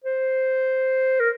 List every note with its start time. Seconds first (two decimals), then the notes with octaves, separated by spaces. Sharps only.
0.04 C5
1.20 A#4